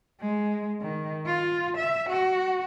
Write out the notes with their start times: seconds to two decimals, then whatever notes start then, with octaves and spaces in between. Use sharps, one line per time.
0.20 G#3
0.80 D#3
1.26 F4
1.77 E5
2.09 F#4